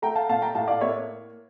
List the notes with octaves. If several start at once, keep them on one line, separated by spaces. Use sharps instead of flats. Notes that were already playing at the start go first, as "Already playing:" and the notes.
A3 G5 A#5
F5 A5
A#2 F5 A5
G5 A#5
A2 F5 A5
D5 F5
A#3 C#5 E5